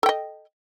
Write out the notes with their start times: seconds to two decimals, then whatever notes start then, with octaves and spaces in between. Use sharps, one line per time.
0.03 A4
0.06 G5
0.09 D#5